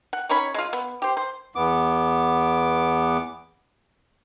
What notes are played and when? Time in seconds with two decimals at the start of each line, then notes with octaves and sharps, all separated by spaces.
0.13 F#5
0.29 C#4 D#4 C#5 B5
0.54 G#3 F4
0.73 B3
1.02 G4 C5
1.17 C5
1.56 E2 B3 D6